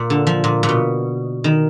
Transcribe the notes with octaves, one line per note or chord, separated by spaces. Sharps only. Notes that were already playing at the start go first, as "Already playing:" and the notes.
Already playing: A#2
D3
F3
A#2
A#2
B2
D#3